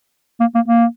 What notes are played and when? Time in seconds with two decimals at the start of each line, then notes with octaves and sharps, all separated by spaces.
0.40 A#3
0.55 A#3
0.68 A#3